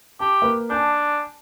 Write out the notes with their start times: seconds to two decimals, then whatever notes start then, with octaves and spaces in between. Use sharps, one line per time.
0.20 G4 A5
0.42 A#3 B4
0.70 D4 G#5 A5 G6